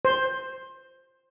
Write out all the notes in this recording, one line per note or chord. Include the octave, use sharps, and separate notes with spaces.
C5